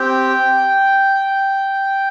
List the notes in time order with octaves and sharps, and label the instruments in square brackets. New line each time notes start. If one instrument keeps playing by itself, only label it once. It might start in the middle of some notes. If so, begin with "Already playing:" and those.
Already playing: [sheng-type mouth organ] C4 G4 G5